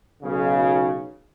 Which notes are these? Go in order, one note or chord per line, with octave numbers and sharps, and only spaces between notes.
B1 C#3